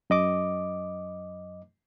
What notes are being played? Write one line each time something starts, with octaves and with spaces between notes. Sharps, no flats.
F#2 D#5 D6